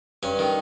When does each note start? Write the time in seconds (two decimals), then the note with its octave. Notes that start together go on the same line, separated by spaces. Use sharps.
0.23 G2 C#4
0.39 D#3